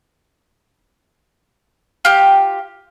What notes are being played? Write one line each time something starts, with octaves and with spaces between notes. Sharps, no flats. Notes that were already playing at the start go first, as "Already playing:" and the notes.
F4 G4